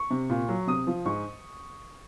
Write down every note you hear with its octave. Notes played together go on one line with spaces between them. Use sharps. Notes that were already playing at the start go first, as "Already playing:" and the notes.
Already playing: C#6
C3
A#2
F#3
C3 D#6
F3
G#2 C#6